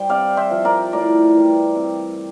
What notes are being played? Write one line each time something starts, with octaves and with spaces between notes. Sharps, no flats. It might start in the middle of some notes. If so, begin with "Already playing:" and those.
Already playing: G3 C5 G5
C3 D5 F5
C5 E5
F3
A#4 D5
A2 A#4 D5
E3 G3
C3